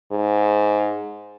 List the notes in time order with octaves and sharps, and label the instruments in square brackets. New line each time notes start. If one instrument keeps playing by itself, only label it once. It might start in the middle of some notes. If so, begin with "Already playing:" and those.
[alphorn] G#2